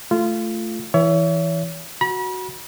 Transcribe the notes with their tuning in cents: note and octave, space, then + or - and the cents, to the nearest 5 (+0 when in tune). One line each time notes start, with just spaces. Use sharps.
A3 +0 F4 -20
E3 +0 C#5 +35 E5 +15
F#4 +0 B5 -40